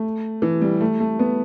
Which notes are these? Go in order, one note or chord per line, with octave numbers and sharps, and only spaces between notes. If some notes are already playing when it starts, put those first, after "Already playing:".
Already playing: A3
E3
G3
A3
A3
B3